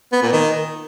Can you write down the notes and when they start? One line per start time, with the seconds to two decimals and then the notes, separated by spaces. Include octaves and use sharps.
0.12 B3
0.23 A#2
0.33 D#3